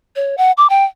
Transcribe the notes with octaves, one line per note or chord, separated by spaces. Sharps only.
C#5
F#5
D6
G5